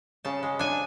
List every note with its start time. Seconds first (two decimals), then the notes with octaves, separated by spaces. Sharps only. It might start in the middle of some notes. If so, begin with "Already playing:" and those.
0.25 C#3 A5
0.43 G#3
0.59 D4 G#5